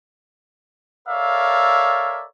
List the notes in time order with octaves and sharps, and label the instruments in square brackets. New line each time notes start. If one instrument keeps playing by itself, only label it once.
[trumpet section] A4 A#4 C#5 D5 E5 F5